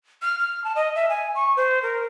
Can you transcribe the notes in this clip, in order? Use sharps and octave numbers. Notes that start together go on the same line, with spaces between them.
F6
F6
A5
D#5
E5
G#5
C#6
C5
A#4